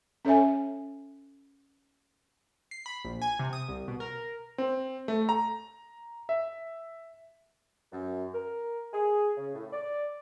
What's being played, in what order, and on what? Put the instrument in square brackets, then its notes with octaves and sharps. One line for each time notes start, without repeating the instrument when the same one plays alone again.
[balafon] C#4 A4 C#5 E5 G#5
[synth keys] C7
B5
A#1
G#5
C3
D#6
C2
B2
A#4
[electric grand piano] C4
A3
A#5
E5
[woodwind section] F#2
A#4
G#4
C#3
A2
D5